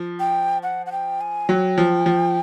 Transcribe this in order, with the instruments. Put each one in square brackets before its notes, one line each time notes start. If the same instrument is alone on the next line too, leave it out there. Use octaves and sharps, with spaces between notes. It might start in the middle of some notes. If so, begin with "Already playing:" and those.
Already playing: [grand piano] F3
[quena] G5
F#5
F#5
G5
G#5
[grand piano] F#3 [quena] G5
[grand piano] F3
F3